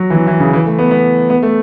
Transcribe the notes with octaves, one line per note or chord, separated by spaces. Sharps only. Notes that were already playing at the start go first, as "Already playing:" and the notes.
Already playing: F#3
E3
F#3
E3
C#3
E3
A3
B3
B3
B3
A3